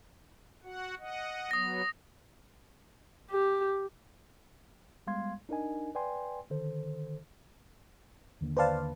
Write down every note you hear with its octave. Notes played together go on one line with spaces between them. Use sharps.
F#4 F#5
D#5 F#5
F#3 B3 D#6 A#6
G4
G3 G#3 B3 F5 C6 G#6
D4 D#4 A#4 D#5 G#5
B4 D5 G5 G#5 C6
D3 D#3 A4 C5
D#2 D3 A#3
B4 C5 D5 F5 A5